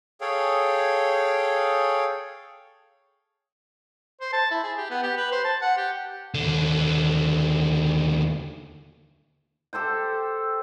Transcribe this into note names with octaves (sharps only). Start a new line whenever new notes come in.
G#4 A4 C#5 F5 G5
C5
A5
E4
G#4
G4
B3
G4
B4
C5
A5
F#5
G4
D#2 D3
G4 A4 C5 G5